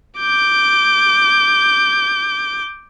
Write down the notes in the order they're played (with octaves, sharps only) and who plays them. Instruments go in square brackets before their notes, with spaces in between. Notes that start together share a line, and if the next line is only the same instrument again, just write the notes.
[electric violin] D6 G6